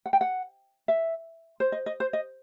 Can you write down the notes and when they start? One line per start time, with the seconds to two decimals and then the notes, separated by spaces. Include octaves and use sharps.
0.06 F#5
0.13 G5
0.21 F#5
0.88 E5
1.60 C5
1.72 D#5
1.86 D#5
2.00 C5
2.13 D#5